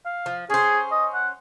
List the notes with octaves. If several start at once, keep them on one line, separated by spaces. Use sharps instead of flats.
F5
F3
C#4 G#4 C5
D#5
F#5